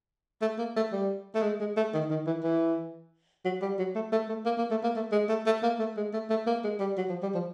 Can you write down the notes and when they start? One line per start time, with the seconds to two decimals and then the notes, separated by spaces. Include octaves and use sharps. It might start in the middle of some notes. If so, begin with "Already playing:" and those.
0.42 A3
0.58 A#3
0.76 A3
0.92 G3
1.35 A3
1.42 G#3
1.60 G#3
1.77 A3
1.94 D#3
2.10 D#3
2.27 E3
2.43 E3
3.45 F#3
3.62 G3
3.78 F#3
3.95 A3
4.12 A3
4.29 A3
4.45 A#3
4.58 A#3
4.71 A3
4.83 A#3
4.96 A3
5.12 G#3
5.29 A3
5.46 A3
5.63 A#3
5.79 A3
5.97 G#3
6.13 A3
6.30 A3
6.47 A#3
6.64 G#3
6.80 G3
6.97 F#3
7.09 F3
7.23 G3
7.34 F3